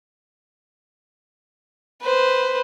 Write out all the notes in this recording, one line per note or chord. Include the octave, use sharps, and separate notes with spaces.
B4 C5